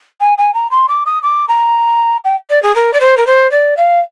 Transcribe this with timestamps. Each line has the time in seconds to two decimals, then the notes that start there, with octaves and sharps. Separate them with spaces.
0.20 G#5
0.38 G#5
0.54 A#5
0.71 C6
0.88 D6
1.06 D#6
1.23 D6
1.48 A#5
2.24 G5
2.50 D5
2.63 G#4
2.75 A#4
2.93 D5
3.00 C5
3.17 A#4
3.27 C5
3.51 D5
3.77 F5